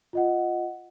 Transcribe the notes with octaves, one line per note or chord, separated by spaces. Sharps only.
F4 D#5 F#5